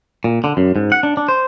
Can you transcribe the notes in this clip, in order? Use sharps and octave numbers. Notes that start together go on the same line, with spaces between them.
A#2
D3
F#2
G#2
F#5
D4
D4
C5